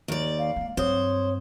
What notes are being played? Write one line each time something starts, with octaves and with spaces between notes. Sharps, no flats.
D#2 D5
F5
G#3 A#3
G2 F#3 C4 C5 C#5 D#6